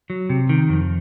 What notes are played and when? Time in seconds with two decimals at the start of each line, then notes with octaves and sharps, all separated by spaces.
0.10 F#3
0.30 C3
0.49 D#3
0.69 F2